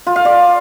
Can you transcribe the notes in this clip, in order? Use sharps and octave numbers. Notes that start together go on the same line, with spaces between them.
F4
F5
D5